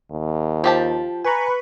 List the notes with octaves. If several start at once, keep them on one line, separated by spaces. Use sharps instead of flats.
D#2
F3 F4 G4 A5
B4 G#5 A#5 B5 C#6